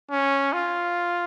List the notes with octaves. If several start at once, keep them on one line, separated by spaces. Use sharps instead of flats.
C#4
F4